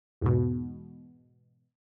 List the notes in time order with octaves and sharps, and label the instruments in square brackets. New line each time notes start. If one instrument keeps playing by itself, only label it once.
[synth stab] E2 G#2 B2